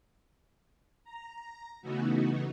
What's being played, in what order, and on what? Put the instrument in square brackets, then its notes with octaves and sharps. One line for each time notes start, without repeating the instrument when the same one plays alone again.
[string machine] A#5
C#3 E3 A3 B3 D#4 F#4